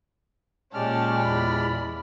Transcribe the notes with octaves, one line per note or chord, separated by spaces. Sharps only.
A#2 G#3 A#3 C#4 G4 D5 A5 F6
E2 B5